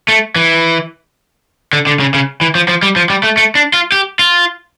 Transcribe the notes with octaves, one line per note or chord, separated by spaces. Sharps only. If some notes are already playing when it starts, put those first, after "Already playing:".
A3
E3
D3
D3
C#3
C#3
E3
F3
F3
G3
F3
G3
A3
A3
D4
F4
G4
F4